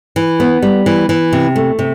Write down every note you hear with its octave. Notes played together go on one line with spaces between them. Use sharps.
E3
B3
G3
E3
E3
C3
A3
C3